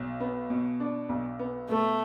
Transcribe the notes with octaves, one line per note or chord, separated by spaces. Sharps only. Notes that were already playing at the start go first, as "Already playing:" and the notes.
Already playing: B1
B3
B2
D4
B1
B3
B2 A3